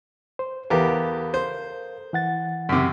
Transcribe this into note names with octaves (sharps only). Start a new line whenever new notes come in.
C5
E2 B3 G4 A4 A#4 F5
C5
E3 F#5 A6
F#2 C3